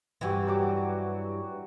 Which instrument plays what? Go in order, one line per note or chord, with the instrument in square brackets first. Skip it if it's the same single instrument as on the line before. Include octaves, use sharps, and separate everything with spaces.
[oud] G2 E3 [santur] C4 F#4 G4
[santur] F#3 F#4 D6